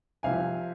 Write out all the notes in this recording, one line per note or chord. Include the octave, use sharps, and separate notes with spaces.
C2 C3 F3 F5 G#5